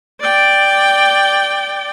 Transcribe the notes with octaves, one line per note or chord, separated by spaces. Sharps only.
D5 G5